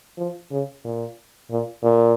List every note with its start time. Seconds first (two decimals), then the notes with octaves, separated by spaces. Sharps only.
0.17 F3
0.51 C#3
0.84 A#2
1.50 A#2
1.83 A#2